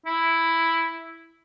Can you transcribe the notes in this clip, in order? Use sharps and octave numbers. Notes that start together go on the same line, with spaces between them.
E4